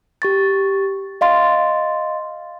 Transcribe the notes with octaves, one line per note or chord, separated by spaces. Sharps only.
G4 C#6 A6
D#5 F5 C6 A6